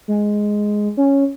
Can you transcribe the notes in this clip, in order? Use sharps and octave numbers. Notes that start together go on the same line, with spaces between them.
G#3
C#4